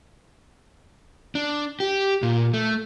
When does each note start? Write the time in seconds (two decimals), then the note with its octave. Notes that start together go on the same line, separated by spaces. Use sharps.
1.35 D4
1.80 G4
2.23 A#2
2.54 A3